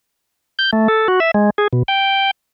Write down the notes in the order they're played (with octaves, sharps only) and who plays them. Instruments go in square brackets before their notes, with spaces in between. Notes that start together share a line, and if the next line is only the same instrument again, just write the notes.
[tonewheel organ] G6
A3
A4
F#4
E5
G#3
G#4
B2
G5